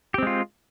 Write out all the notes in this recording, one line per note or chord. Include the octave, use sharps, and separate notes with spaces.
G#3 C4 F4 G4